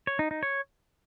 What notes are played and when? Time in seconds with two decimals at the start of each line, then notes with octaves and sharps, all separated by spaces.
0.07 C#5
0.19 D#4
0.31 D#4
0.43 C#5